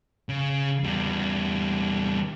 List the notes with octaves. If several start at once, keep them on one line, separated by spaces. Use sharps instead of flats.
C#3
E2 G3